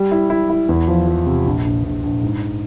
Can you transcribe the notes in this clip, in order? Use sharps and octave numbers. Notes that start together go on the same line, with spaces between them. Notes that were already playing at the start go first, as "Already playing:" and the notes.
Already playing: G3
E4
E4
E4
E2
F3
F3
C3
A#1
A#1
A#1
A#1
G#2